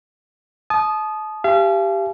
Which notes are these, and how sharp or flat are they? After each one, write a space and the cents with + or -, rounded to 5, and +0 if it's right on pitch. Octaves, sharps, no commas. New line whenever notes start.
A5 -35 D#6 -10
G4 +0 F5 -40 G#5 +45